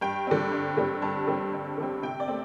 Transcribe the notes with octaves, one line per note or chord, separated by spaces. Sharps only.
G2 G5
D3 G3 C4
G2
D3 G3 C4
G2 A5
D3 G3 C4
G2
D3 G3 C4
C3 G5
D5
A3 C4